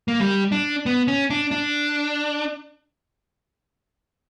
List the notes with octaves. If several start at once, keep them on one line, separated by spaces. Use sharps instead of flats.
A#3
G3
D4
B3
C#4
D4
D4